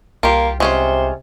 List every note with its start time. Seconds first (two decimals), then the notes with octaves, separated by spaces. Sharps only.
0.23 C2 A#3 F4 G4
0.60 C3 G#3 C#4 F4 C5